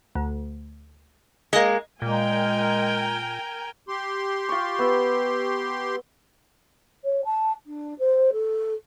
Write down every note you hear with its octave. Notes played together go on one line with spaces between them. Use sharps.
D2
G#3 A#3 D#5
A#2 G#3 A#4 G5 G#5
G4 C6
F4 C#6
B3 E5
C#5
A5
D4
C5
A4